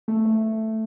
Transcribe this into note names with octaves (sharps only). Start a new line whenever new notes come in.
A3
A3